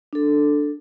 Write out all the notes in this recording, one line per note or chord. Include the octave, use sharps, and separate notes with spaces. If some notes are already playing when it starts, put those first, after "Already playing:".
D4 A4